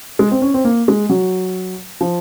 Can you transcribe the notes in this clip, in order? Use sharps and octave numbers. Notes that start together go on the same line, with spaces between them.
G#3
C4
C#4
C4
A#3
G#3
F#3
F3